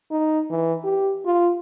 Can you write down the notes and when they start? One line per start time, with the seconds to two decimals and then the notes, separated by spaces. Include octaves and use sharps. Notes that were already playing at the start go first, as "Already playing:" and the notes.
0.11 D#4
0.50 E3
0.84 G4
1.25 F4